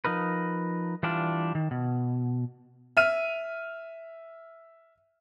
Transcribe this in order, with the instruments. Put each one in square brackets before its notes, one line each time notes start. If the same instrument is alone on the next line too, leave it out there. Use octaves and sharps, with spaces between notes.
[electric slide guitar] F3 D#4 A#4 B4
E3 G3 D4 F4
D#3
B2
[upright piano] E5 F6 D#7